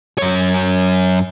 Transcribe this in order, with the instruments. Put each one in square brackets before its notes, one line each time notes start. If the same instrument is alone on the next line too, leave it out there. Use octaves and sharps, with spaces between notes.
[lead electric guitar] F#2 C#5